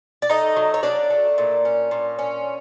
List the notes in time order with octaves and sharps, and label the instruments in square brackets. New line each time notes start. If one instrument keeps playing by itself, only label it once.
[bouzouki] D5
A3 D#4 D#5
F#3
C#5
F#3 D4 D5
A3
A#2
C#4
A#2
C#4